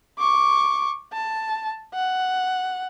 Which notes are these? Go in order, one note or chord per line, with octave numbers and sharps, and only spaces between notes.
C#6 D6
A5
F#5